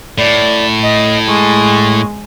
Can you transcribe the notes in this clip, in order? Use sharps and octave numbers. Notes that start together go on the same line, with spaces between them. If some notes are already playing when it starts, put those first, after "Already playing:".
A2 D5
D#5
G#3 C#6